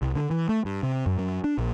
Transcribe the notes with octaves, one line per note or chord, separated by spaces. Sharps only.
C2
D3
E3
A3
G2
C3
F#2
F#2
D4
A#1